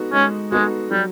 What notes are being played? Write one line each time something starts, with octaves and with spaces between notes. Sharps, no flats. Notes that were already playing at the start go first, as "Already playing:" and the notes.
Already playing: G#3 B3 D#4 F#4 A4
G#3 C#4
G#3 B3 D#4 F#4 A4
F#3 G3